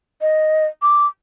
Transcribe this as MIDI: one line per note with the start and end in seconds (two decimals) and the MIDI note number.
0.21 0.66 75
0.82 1.07 86